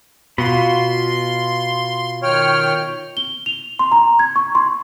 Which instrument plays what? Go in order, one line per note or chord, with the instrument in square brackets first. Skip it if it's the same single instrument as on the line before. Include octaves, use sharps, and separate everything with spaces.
[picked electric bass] B2 [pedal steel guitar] F4 F#5 B5 [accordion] C6
[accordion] D#3 G5 F6 [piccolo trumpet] C#5
[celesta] G7
F7
C6
A#5
G#6
C#6
C6